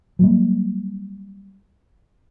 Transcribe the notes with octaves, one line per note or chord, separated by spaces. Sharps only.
F#3 G3 A#3